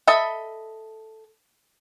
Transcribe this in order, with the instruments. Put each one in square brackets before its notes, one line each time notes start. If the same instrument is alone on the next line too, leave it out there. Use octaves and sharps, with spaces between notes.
[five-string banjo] A4 D#5 E5 B5